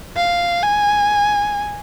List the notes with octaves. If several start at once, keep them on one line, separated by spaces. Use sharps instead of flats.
F5
G#5